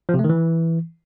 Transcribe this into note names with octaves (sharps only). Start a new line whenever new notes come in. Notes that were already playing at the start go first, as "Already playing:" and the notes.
F3
C3
A3
D#3
E3